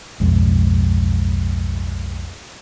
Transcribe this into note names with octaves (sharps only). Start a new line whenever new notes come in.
B1 F2 G#2